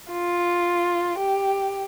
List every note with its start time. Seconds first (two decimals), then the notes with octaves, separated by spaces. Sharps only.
0.11 F4
1.18 G4